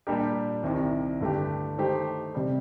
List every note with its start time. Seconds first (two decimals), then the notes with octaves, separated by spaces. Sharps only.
0.07 A#2 G3 D4 G4 A#4
0.63 C2 C3 D#3
1.21 G2 D3 A3 D4 G4
1.77 D#3 A3 D#4 G4 C5
2.35 C3 G3